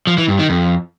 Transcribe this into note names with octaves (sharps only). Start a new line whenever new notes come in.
F3
E3
G2
D#3
F2